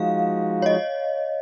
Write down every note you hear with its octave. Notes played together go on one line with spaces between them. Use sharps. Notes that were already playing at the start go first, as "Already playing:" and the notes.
Already playing: F3 G#3 D#4 F#4 F5
C#5
D#5